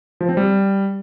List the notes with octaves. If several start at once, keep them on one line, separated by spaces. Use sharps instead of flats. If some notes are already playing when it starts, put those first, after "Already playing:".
F3
C4
G3